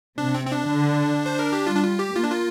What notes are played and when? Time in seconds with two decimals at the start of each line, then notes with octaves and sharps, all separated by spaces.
0.18 C3 D4
0.35 C4
0.46 C4
0.51 D4
0.68 D3
1.26 C5
1.39 A#4
1.53 G4
1.66 G3 F4
1.75 D4
1.83 F4
1.99 G4
2.15 A#3 F4
2.24 D4
2.32 F4